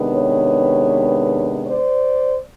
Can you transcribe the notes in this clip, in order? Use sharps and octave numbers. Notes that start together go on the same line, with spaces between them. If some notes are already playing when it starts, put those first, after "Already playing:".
Already playing: C3 D#3 G#3 B3 D4
B4 C#5
C5 D5